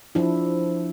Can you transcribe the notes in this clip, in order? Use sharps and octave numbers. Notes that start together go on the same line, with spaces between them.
F3 D4 E4